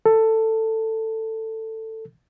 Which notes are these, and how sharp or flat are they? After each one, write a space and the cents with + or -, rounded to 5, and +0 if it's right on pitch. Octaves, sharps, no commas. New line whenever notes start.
A4 +15